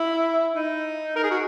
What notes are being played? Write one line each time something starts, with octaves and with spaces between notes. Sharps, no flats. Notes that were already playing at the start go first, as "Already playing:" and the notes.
Already playing: E4
D#4
A#4
G#4
F#4